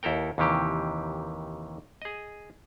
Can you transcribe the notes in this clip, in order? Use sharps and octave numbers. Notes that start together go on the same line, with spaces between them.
D#2 E4 A4 A#4 G5
D#2 C3 D#3 E3 G4
G#4 D#5